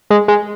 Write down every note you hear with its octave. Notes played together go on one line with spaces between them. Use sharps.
G#3
G#3